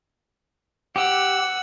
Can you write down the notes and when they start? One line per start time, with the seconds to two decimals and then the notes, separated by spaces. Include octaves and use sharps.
0.96 G4 F#5 E6